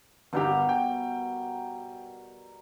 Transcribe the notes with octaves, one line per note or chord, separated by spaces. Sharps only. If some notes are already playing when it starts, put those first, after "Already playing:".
G1 G2 B2 G3 G4 A#4
G5